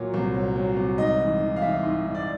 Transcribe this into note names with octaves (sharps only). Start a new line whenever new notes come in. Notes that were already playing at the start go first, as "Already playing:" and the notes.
Already playing: A#2 F#3
C2
F#3
F#3
C2
G#2 D#5
E3
E3
F5
E3 E5
G#2
G#2
D5